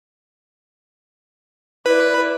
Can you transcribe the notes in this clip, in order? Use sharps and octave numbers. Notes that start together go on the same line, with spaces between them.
E4 B4 D5